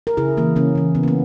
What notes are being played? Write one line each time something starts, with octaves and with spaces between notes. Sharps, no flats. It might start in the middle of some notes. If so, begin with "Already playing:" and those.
A#4
C#3 E4 G#4
E3 A#3
C#3 A#3 C#4
E3 A#3
C#3 B3
A#3
B3